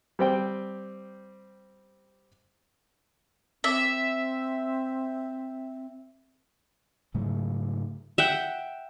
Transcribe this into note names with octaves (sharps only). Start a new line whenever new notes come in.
G3 C4 G5
C4 E5
G#2 C#3 F#3 A3
E5 F#5 G5